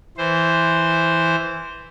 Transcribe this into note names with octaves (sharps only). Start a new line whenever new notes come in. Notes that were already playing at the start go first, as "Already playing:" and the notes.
E3 C5